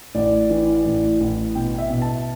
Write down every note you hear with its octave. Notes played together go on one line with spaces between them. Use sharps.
A1 D5
E3
A1
A1
B2 G5
E5
B2
A5